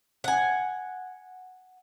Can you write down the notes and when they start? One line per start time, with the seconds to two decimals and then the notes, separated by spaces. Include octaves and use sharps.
0.24 F#5 G#5